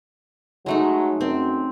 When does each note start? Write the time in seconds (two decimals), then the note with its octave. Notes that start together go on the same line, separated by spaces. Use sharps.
0.66 F#3 G#3 A3 D#4
1.21 F#2 C4